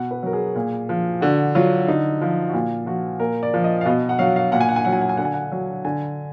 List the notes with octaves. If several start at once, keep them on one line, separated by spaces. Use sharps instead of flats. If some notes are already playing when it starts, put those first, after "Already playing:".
Already playing: B2 F#5
B4
F#3 A#4
G#4
A#2
F3
D3 F#4
F#3 F4
D3 D#4
F3
F#4
A#2 F4
F3 F#4
A#2 A#4
D5
F3
D#5
F5
B2 D#5
F#5
F#3 F5
F5
A#2 F#5
G#5
F#5
G#5
F#3 F#5
G#5
F#5
G#5
D3 F#5
G#5
F#5
F#3
D3 G#5